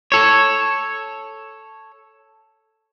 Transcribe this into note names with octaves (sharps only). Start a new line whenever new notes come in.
A4 C#5